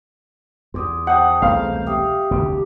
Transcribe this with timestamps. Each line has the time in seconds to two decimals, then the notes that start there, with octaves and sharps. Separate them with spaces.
0.74 E2 C6 D6 D#6
1.07 C5 F#5 G5 A5 D#6
1.42 E1 C2 A3 G#4 B4 F5 A#5
1.87 G4 E5 G5 D#6
2.31 F1 D2 C3